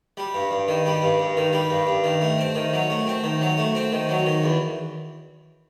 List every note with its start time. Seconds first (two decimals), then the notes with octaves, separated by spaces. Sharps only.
0.17 G3
0.34 G2
0.51 G2
0.68 D#3
0.86 G3
1.02 G2
1.20 G2
1.37 D#3
1.53 G3
1.71 G2
1.87 G2
2.04 D#3
2.22 A3
2.38 C4
2.56 D#3
2.73 F#3
2.90 A3
3.07 C4
3.24 D#3
3.41 F#3
3.57 A3
3.75 C4
3.92 D#3
4.09 F#3
4.26 D#3
4.44 E2